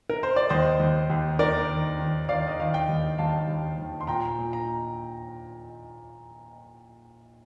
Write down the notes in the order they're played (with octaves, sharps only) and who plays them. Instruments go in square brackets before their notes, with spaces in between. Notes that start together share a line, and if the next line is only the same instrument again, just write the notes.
[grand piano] A#4
C5
D5
D#2 C5 D#5
D#2
D#2
D#3 A#4 D5
D#3
D#3
D#3 D5 F5
D#5
D#3 F5
D#5 G5
D#2
D#2 F5 A5
D#2
D#2
C6
A#2 G5 A#5
A#2
A#5